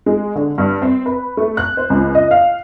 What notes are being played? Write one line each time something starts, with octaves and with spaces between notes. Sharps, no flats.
G#3
D3
G2
C4
B4
A3
F#6
C5
C#2
D#5
F5